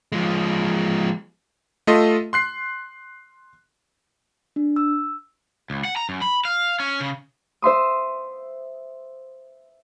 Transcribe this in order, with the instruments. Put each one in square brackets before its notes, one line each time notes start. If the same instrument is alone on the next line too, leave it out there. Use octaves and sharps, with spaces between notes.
[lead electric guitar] F3 G#3
[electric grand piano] A3 F4 A4 D#5 C6
C6 F#6 C7
[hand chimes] D4
E6
[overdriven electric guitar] C#2
F#5
A#5
F#2
B5
F5
C#4
C#3
[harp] C5 E5 C6 D#6